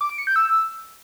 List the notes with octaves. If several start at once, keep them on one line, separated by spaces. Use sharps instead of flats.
D6
D7
C#7
G6
E6